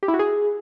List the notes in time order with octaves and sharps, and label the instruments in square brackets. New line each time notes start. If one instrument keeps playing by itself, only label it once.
[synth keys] G4
E4
F#4
G#4